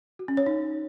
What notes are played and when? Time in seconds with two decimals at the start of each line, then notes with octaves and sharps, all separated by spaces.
0.19 F#4
0.28 C#4
0.37 C#5
0.46 D#4